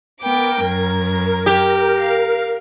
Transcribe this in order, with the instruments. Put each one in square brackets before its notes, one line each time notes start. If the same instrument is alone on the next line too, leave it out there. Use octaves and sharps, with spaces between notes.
[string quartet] B3 G5 D6 [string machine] A#4
[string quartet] F#2 G#6
[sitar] G4
[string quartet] F5